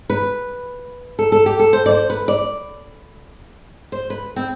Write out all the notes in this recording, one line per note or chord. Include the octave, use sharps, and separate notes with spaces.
B4
A4
A4
G4
A4
C5
D5
C5
B4
D5
C5
B4
C4